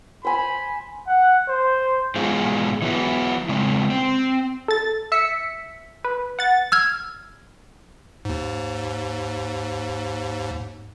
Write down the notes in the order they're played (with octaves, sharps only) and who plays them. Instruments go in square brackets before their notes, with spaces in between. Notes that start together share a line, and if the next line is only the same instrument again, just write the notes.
[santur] C5 G#5 [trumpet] B5
[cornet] F#5
C5
[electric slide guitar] G#2 B2 E3 G#3 F4 G#4
E3 F#3 B3 E4
C#3 G#3 C4
C4
[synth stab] A4 A6
E5 E6 B6 C#7
B4
F#5 A6
[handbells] E6 F6 G#6
[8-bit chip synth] D#2 G#2